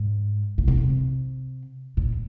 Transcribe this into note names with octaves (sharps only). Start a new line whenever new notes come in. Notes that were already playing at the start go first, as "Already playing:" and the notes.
Already playing: G#2
A#2
B2
C3
A#2